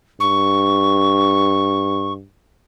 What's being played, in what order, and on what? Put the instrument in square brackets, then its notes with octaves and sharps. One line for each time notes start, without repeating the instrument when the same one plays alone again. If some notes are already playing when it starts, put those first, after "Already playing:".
[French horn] G2 [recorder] C#6